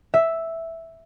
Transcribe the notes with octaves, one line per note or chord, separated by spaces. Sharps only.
E5